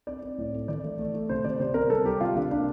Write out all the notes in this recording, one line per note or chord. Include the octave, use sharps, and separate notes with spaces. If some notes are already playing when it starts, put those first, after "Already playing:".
C4 D5
C4
A2
A3
E3 D5
A3
A3
A3
C3 C5
C3 D5
C3 C5
C3 A#4
G3 A4
G3 G4
C3 F4
C3 D4
A#3 D4